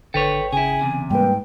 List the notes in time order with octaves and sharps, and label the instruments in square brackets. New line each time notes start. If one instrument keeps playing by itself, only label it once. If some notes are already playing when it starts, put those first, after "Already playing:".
[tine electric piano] G#1 G5 [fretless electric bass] D3 [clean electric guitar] A4 B4 C#5
[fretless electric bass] C#3 [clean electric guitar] E4 G#4 [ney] G#5
[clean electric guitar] E2 C3
[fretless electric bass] G#2 [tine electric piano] G3 A#3 B4 [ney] G5